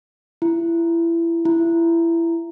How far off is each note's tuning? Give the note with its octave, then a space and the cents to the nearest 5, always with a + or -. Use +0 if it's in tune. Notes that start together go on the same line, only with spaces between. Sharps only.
E4 +25
E4 +20